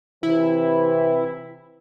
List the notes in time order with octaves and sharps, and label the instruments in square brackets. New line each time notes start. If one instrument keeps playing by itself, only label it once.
[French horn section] C3 E3 [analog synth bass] E4